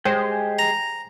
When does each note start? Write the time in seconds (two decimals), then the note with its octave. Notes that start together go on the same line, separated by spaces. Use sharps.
0.05 G#3 G4 G#4 C5 G5
0.59 A#5